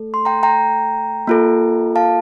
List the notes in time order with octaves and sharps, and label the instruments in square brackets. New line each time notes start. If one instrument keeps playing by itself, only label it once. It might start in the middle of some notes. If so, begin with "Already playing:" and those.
Already playing: [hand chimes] A3 A4
C6
G5 A#5
G5 A#5
A#3 F4 A4
F5 A5